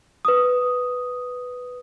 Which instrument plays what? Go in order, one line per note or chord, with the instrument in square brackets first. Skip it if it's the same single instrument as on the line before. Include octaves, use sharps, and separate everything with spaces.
[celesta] B4 D#6